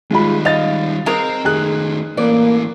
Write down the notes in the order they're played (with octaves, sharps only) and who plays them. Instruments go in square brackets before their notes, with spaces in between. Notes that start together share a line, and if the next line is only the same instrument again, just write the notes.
[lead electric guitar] D#3 G3 [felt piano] G#3 F4 B5
[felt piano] D#5 A6 [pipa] F5
[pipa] G#3 A#4 [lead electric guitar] C4
[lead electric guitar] D#3 A3 [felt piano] G#4 F#6
[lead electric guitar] E3 A3 [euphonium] A#3 [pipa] D5